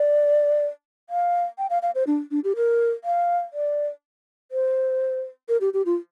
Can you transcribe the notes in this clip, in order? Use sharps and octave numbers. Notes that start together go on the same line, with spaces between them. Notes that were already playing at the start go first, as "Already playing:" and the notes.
Already playing: D5
F5
G5
F5
F5
C5
D4
D4
G4
A#4
F5
D5
C5
A#4
G4
G4
F4